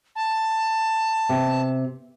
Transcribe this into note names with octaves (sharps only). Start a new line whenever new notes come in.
A5
C3